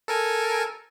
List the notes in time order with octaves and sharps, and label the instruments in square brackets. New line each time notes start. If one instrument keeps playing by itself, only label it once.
[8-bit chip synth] A4 A#4 G#5